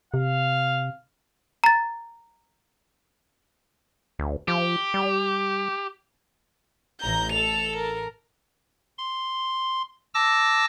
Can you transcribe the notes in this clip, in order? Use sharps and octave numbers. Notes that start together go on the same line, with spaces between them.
C3 F5
A#5 A6
D2
F3 G4
G3
A1 A#5 G6
A4 F7
A#4
C6
A5 D6 E6 A#6